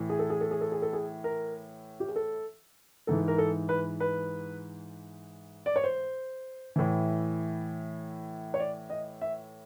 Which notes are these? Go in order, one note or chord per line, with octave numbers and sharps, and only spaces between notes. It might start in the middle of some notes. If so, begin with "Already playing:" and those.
Already playing: A2 E3
G#4
A4
G#4
A4
G#4
A4
G#4
A4
G#4
A#4
G4
G#4
A4
G#2 E3 A4
A#4
A4
B4
B4
D5
C#5
C5
A2 E3
C#5
D5
D#5
E5